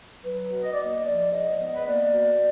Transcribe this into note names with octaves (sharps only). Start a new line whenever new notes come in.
F#3 B4
B2
D#5
D5
A#3 D#5
F3 D5
G#2 D#5
B3 D#5
B4
A#3 D5
B2